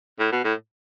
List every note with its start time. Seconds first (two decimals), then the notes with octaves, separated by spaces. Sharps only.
0.20 A2
0.32 B2
0.44 A2